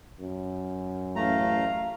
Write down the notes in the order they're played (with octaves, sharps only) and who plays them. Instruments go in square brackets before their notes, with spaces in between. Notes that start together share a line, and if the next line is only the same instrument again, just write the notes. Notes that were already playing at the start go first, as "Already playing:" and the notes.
[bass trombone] F#2
[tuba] A1 [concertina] A3 A#5 [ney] F5